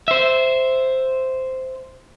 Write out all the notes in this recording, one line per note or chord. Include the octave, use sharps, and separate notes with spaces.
C5 E5